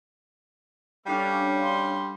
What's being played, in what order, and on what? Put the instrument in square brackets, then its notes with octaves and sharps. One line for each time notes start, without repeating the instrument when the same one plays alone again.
[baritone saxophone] G3 [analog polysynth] C#4 D4 F5 [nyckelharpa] A4
[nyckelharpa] C6